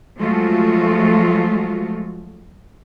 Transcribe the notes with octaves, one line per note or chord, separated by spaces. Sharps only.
F3 F#3 G#3 A3 F4 F#4